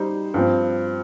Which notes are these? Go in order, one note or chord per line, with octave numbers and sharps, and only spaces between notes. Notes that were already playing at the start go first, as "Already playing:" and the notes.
Already playing: G3 D#4 C5
G2 F3 C4